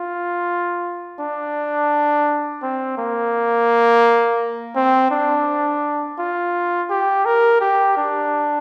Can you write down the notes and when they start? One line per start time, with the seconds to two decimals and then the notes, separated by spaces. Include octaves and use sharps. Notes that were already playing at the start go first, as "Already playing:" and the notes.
Already playing: F4
1.20 D4
2.62 C4
2.98 A#3
4.76 C4
5.11 D4
6.19 F4
6.90 G4
7.25 A#4
7.61 G4
7.97 D4